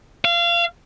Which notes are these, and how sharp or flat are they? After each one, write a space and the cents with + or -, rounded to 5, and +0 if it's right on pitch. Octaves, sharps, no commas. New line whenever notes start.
F5 -25